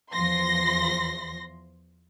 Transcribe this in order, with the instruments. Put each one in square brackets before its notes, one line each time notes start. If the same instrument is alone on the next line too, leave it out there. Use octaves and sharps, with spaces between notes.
[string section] E2 F3 C6 A#6